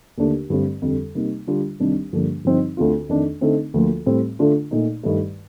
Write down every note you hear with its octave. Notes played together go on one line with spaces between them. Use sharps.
D#2 D3 A3 D4
G2 D3 A3 C4
F2 D3 G3
C3 G3 A#3 D#4
D3 G3 D4 F4
C2 C3 D#3 G3 D4
G2 D3 F3 A#3 D4
G2 D3 F3 C4 D#4
D2 D3 A3 C4 F4
F2 D#3 A3 D4
D3 A3 C4 D#4
D2 D3 F3 A#3 F4
A2 G3 C4
D3 A3 D4 F4
A#2 A3 D#4
G2 D#3 A3